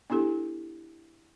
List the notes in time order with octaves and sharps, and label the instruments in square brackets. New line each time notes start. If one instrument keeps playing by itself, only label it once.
[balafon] B3 D4 E4 G4 A4